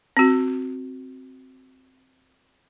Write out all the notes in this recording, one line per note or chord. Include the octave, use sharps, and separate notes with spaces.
C4 F#4